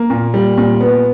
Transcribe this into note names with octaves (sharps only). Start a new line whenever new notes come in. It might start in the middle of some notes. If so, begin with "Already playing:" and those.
Already playing: A#3
A#2
G3
A#2
B3